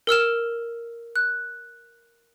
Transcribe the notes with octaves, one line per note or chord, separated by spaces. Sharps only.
A#4 E6 F6 E7
F#6